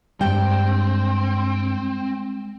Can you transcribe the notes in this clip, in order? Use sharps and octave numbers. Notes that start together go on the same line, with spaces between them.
G2 G3 G#3 C4 G5